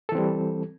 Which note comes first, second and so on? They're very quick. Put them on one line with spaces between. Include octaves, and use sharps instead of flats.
A4 E3 C4 G3